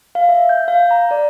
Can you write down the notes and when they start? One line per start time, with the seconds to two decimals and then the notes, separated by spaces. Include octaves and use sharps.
0.15 F5
0.29 E5
0.49 G6
0.68 F5
0.91 A#5
1.11 D5